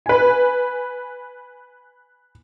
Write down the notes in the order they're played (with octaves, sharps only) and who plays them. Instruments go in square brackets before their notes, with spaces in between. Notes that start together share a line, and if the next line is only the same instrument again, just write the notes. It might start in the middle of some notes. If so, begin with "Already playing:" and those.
[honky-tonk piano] B4 G#5